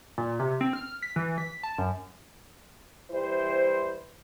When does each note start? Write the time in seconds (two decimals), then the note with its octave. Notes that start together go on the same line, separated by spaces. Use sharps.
0.18 A#2
0.39 C3
0.61 C4
0.73 F6
1.03 B6
1.16 E3
1.38 B6
1.63 A5
1.78 F#2
3.11 E3 G3 E4 C5